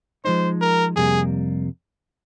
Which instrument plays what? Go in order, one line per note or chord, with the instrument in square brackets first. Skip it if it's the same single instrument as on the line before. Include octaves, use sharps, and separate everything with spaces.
[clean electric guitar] F3 G#3 D#4 [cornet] C5
[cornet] A#4
[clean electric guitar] F2 C3 G3 A#3 [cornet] G#4